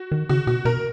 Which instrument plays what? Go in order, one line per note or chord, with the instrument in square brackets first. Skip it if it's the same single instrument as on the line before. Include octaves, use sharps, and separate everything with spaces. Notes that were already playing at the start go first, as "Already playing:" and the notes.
Already playing: [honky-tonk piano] F#4
[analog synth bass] D#3
[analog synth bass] C#3 [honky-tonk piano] F#4
[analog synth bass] B2 [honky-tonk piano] F#4
[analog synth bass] B2 [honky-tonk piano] A#4